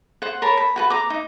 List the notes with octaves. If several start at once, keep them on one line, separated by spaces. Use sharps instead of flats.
C5 F#5
A#4 C#5 A5 B5
B5
F#4 B4 A5
A#5 D6
D#4